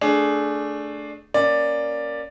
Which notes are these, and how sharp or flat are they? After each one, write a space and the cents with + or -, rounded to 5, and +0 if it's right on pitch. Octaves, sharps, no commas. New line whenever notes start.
A3 +0 D4 +0 G#4 +15
A#3 +0 C#4 +0 D5 +5